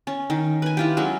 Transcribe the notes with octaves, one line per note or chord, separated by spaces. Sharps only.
C#4
D#3
B4 G#5
E4 F4 G4
F#3 G#3 C#4